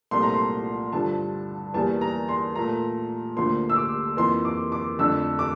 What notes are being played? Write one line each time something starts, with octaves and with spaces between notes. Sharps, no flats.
C2 A#2 F3 A3 C6
A#5
C6
G2 D3 F3 A5
E2 E3 G3 A#3 A5
A#5
C6
A#2 A3 A#5
D2 D3 F3 A#3 C6
E6
D6
F2 E3 A#3 C6
D6
D6
F2 D3 A3 E6
D6